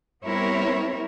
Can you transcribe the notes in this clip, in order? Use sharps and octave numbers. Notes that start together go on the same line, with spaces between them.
G3 B3 C4 E4 A#4 C#5